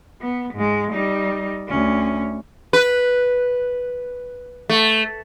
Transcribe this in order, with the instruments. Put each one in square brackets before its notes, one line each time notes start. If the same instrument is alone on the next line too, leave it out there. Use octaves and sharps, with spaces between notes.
[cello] B3
G#2 G#3
G3 D#4
D2 C#4
[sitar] B4
A3